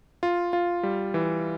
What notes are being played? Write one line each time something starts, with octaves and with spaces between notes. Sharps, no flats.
F4
F4
G3
E3